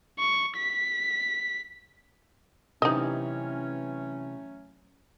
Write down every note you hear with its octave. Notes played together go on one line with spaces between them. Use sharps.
C#6
B6
C3 E3 F#3 A3 C#4 D#4 D#5